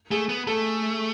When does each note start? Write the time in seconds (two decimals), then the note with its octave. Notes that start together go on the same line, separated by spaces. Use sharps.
0.11 A3 G#4
0.29 B3
0.47 A3 A4